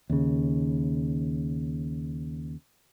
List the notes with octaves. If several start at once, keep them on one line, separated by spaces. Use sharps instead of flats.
D#2 C#3